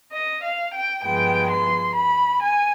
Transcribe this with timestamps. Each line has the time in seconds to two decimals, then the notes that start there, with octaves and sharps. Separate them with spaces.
0.11 D#5
0.42 F5
0.73 G5
1.04 G2 F3 G#3 B3 G5
1.50 C6
1.96 B5
2.42 G#5